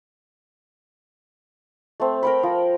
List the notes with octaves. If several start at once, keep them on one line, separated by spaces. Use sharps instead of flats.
A3 C4
A#4 G5 B5
F3